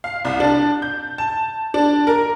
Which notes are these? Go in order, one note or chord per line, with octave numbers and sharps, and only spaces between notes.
F5
C2
D4
G6
A5
D4
A#4